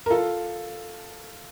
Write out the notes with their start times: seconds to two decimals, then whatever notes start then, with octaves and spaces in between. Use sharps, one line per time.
0.06 A#4
0.10 F4 A4